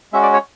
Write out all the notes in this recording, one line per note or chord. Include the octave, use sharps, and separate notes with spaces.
G#3 C#4 F#4 E5
D5
C#5